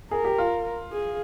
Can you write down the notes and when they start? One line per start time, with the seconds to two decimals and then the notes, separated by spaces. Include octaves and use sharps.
0.11 G#4 A#4
0.24 G4
0.38 F4
0.92 G#4